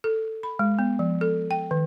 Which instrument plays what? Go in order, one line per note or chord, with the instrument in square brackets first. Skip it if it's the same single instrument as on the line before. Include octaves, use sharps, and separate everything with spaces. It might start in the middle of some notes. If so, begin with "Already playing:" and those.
[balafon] A4
B5
G#3
B3
F3
A4
G5
D#3